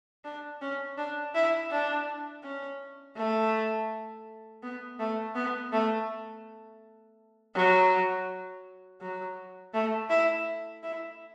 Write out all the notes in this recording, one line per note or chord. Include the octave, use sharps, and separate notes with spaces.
D4
C#4
D4
E4
D4
C#4
A3
B3
A3
B3
A3
F#3
F#3
A3
E4
E4